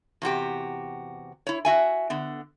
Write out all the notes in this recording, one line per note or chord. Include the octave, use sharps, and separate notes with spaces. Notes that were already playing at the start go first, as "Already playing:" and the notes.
E2 C3 F#4 G4
E4 C#5
F#4 E5 G#5
D3 B3